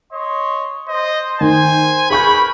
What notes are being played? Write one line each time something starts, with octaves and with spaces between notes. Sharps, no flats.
C#5 D#5 C6
C5 D#5
D#3 G#5
E4 G#4 A#4 B4 B5 C#6 G6